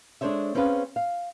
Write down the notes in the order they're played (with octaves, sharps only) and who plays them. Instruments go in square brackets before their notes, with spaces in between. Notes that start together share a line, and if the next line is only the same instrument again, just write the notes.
[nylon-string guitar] G#3 D4 A4 C5 C#5 E5
C4 C#4 E4 G#4 B4 F5
F5